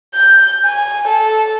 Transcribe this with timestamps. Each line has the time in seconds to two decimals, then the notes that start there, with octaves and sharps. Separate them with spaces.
0.14 G6
0.66 G#5
1.08 A4